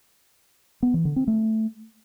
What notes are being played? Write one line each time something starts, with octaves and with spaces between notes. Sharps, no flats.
B3
E3
D3
C4
A3